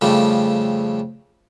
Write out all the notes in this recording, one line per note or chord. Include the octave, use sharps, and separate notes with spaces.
F2 C#3 F3 G3 A3